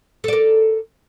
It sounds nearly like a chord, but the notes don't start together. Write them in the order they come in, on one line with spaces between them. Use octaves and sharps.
A4 D5 A#4